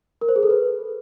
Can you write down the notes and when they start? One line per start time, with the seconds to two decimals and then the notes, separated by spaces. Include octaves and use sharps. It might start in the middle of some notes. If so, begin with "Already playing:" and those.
0.21 A#4
0.29 C5
0.36 G#4
0.43 A4
0.50 B4